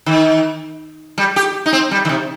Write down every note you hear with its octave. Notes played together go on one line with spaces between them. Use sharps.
D#3
G3
G4
D#4
C4
G3
D#3
C3